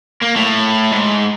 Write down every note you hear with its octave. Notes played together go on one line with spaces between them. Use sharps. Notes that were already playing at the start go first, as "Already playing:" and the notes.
A#3
A2
G#2